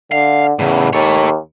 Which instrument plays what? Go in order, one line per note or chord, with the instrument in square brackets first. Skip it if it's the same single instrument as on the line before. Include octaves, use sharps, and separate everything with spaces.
[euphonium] D3 [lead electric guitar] F5
[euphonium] E2 [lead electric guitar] A2 C#3
[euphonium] D#2 [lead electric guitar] A4 C#5